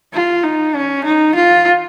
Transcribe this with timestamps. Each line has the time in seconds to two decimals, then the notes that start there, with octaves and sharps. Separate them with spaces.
0.14 F4
0.44 D#4
0.75 C#4
1.05 D#4
1.35 F4